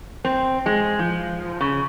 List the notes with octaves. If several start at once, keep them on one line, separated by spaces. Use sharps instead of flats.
C4
G#3
F3
C#3